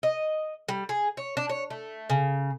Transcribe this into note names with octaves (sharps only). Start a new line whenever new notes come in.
D#5
G3
G#4
C#5
D4
C#5
A3
C#3